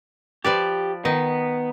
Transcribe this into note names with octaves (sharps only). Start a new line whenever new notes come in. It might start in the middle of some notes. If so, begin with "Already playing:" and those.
F3 G4 B4 D5
D#3 B3 D#4